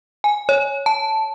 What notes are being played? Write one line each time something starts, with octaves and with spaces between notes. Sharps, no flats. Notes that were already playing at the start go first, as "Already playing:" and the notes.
G#5
C#5
A5